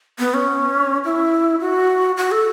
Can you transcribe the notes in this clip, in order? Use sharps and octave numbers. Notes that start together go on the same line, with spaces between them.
B3
C#4
E4
F#4
F#4
A4